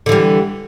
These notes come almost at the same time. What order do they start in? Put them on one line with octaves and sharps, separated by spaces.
D3 E3 G3